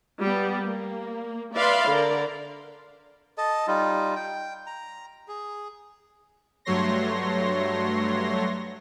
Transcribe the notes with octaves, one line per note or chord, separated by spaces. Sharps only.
G3 B3
A#3
B4 D5 E5 F5 B5 C6
D3 A#4 D5
A4 D#5 A5
G3 D#4 F4
G5
A#5
G#4
G2 F#3 A3 C#5 C6 A#6